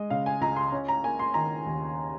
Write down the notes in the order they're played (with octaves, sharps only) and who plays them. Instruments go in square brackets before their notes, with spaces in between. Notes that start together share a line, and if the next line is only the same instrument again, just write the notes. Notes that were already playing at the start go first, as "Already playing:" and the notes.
Already playing: [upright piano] G#3 D#5
C#3 F5
G#5
C#2 A#5
C6
C#4
A#5
A#3 G#5
C6
D#3 A#5
D#2